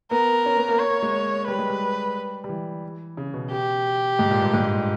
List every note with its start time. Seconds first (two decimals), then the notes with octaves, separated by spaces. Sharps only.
0.11 B3 A#4
0.46 C#4
0.57 B3
0.69 A#3
0.80 C#5
0.90 A#3
1.03 G#3
1.47 G3 B4
1.59 G#3
1.70 G3
2.44 G3
2.49 E3
3.17 C#3
3.34 B2
3.51 G4
4.19 G#2
4.31 A#2
4.41 G2
4.54 G#2